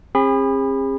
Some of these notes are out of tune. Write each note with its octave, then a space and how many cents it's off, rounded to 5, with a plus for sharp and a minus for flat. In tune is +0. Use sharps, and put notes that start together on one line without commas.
C4 +45 G#4 -40 B5 +0